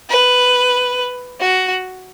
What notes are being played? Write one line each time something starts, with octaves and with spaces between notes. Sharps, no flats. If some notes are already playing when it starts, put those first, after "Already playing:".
B4
F#4